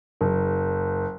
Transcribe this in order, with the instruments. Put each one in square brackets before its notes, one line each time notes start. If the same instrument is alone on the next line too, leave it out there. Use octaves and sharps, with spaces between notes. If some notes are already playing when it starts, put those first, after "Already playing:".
[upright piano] F#1